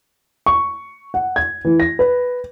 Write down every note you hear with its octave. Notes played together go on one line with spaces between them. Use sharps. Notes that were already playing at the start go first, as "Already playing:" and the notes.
C#6
F#5
G#6
E3
A#6
B4